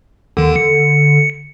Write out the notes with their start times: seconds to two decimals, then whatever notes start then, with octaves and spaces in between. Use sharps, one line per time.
0.37 D#2 D3 D#3
0.56 C#7